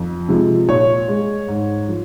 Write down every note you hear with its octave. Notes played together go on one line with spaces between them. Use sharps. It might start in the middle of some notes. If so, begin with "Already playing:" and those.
Already playing: F2
C3 F3 G#3
A#2 C#5
G#3
G#2
F3